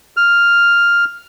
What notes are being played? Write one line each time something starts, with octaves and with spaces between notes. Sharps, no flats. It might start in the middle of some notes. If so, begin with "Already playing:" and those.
F6